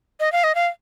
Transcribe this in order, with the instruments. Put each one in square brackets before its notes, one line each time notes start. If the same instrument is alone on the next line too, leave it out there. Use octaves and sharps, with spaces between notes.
[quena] D#5
F5
D#5
F5